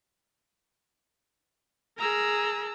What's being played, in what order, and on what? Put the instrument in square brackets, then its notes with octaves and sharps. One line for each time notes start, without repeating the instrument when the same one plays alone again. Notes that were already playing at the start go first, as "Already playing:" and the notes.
[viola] G#4 A#4 [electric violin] A#5 E6